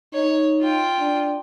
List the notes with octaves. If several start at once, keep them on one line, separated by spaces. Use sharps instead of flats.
D#4 C#5
F4 G5
D4